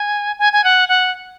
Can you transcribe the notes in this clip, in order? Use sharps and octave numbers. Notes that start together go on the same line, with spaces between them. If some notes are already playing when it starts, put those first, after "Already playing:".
Already playing: G#5
G#5
G#5
F#5
F#5